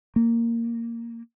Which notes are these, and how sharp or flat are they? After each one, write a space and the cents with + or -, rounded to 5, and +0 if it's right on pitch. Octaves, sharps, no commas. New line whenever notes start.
A#3 -10